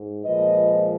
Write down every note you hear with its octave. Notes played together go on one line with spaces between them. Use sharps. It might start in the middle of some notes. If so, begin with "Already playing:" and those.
Already playing: G#2
A#2 F3 G#3 B4 D#5